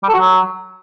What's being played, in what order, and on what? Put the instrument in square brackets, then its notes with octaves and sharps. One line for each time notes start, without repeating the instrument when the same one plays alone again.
[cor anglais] G3
A4
F#4
F#3